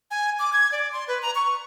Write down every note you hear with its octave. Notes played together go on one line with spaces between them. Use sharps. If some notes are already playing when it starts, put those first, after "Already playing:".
G#5
D6
G#6
D5
C6
B4
A#5
C#6